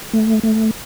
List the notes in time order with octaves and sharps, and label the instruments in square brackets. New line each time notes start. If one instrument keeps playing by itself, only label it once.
[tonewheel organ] A3
A3